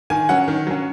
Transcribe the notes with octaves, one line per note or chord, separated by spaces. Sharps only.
D#3 G#5
F#3 C#4 F#5
D#3
F#3 C#4